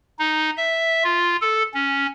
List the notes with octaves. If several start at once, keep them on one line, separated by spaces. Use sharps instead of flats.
D#4
E5
F4
A4
C#4